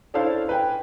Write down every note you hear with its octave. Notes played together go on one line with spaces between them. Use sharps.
C#4 D4 E4 A4 C5 F5
B4 G5 G#5